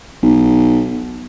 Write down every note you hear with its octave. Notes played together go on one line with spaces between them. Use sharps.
B1